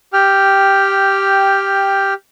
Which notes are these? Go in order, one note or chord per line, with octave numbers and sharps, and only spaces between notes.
G4 G5 F6